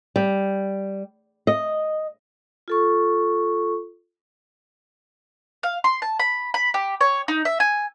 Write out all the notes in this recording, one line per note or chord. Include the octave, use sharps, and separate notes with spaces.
G3
D#5
F4 A4 C#6
F5
C6
A5
B5
B5
G4
C#5
D#4
E5
G#5